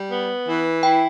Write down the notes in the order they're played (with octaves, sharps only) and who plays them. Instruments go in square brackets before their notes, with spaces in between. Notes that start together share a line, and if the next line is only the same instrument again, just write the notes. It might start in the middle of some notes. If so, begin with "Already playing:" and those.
Already playing: [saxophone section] G3
B3
E3
[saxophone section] E4 [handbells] G5